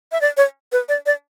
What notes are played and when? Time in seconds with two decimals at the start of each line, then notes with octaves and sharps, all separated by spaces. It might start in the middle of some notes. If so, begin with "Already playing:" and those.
0.12 E5
0.21 D5
0.37 C#5
0.72 B4
0.88 D5
1.06 D5